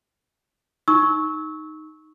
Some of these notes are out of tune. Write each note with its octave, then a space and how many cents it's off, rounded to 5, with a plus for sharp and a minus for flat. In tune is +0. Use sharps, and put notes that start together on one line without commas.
D#4 +0 C#6 +0 E6 -25